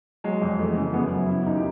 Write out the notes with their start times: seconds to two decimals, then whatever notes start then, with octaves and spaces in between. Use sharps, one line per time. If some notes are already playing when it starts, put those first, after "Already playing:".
0.24 F#3 G#3
0.42 F2
0.59 E3 A3
0.71 G#3
0.77 C#3
0.82 G#3
0.94 F#2 B3
1.11 F#3
1.18 E4
1.29 C#3 E4
1.46 D#2 D#4
1.55 G4